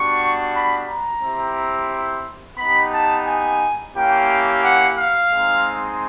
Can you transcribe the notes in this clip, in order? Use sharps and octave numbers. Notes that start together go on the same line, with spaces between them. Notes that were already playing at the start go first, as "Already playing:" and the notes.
Already playing: G3 B3 D4 F#4 C#6
B5
A#5
C4 E4 G4
B3 D#4 G4 B5
A5
G#5
A#3 C#4 E4 G4 G5
F#5
F5
G#3 C4 D#4